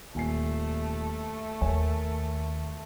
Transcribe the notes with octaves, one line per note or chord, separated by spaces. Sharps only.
D#1 A3 G#5 C7
D#2 A#4 C#5 G#5